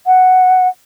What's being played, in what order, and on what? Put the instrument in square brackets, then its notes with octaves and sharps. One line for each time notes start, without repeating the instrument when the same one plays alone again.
[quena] F#5